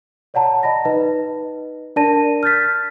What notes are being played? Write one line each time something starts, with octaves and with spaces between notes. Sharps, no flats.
C#5 D5 F#5 A5 A#5
D#5 A5 B5 A#6
D#4 B4 D#5
D4 A#4 D5 A5 A#6 D#7
F6 G6 A6 B6